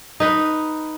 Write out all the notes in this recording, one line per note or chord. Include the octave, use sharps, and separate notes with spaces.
D#4 B4